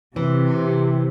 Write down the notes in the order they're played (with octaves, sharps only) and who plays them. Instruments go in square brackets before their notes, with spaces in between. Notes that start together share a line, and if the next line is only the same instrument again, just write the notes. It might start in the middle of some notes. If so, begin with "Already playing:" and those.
[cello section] C3 [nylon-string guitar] E3